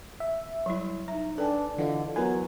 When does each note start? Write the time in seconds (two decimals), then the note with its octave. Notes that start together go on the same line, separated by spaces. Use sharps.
0.20 E5
0.66 F#3 G3 E4
1.08 D#4 E5 A#5
1.38 D4 A4 B4 G5 G#5
1.78 D3 E3 F4 D#5 F#5
2.16 F#3 B3 E4 A#4 B4 G#5